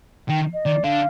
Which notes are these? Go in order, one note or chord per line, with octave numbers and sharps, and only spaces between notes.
D#3 G5
D#5
D#3 D5
D3 F5